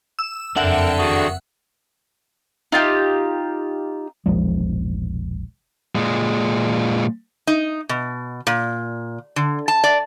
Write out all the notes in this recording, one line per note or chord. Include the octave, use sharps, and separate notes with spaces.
E6
F#1 F2 C4 D4 A4 A#4 E5 F#5
D#3 F#4 G#4
D#4 F4 G4
E1 A#1 F3 G#3
A#2 G#3
D#4
B2
A#2
D3
A5
D5